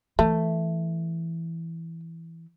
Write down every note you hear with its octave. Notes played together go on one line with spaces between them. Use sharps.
E3 A3